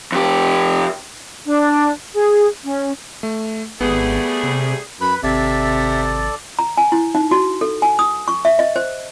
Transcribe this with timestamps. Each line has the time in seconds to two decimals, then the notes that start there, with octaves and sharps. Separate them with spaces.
0.12 F2 G4
1.46 D4
2.13 G#4
2.64 C#4
3.23 A3
3.81 G#1 G3 A3 B3 G#4
4.43 C3
5.01 F#2 B4 B5
5.23 G#1 C3 A4 D5 E5
6.59 A#5
6.77 G#5
6.92 E4
7.15 D#4
7.31 F#4
7.61 A4
7.82 G#5
7.99 D#6
8.28 C#6
8.45 E5
8.59 D#5
8.76 C5